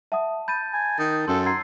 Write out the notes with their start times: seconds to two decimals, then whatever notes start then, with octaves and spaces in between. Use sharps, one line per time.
0.12 E5 F#5 A5 D#6
0.48 B5 G6 A6 D#7
0.73 G#5
0.99 D#3 D#4 A6
1.28 F#2 A4 C6
1.46 F#5 A#5 C6 E6 G#6 C7